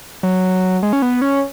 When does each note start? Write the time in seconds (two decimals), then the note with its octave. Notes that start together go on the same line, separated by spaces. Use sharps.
0.23 F#3
0.83 G#3
0.93 C#4
1.02 B3
1.22 C#4